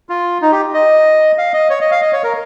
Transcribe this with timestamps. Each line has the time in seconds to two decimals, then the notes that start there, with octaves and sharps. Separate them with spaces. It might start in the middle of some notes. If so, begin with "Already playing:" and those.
0.09 F4
0.42 D#4
0.52 G4
0.74 D#5
1.38 F5
1.54 D#5
1.70 C#5
1.81 D#5
1.91 F5
2.02 D#5
2.13 C#5
2.23 A#4